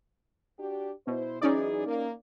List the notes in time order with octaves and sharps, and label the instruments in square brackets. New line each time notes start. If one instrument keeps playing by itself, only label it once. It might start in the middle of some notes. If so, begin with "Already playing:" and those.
[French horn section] D4 F#4 G4
[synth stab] B2 [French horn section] E4 C5
[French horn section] E3 F#3 G#4 [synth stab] C#4 D#4 D5
[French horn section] A#3